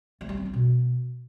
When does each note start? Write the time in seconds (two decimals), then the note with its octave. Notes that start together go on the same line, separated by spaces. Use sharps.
0.21 A3
0.29 G3
0.37 C4
0.45 D4
0.54 B2